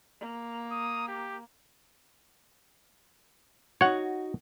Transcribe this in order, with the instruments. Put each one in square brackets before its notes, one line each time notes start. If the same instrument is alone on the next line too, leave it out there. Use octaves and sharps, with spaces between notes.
[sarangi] A#3
[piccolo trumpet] D#6
G4
[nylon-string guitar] D#4 F#4 [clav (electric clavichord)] C#5 F#5